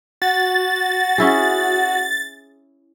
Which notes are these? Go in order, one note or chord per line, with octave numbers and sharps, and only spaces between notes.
F#4 A6
C#4 E4 G#4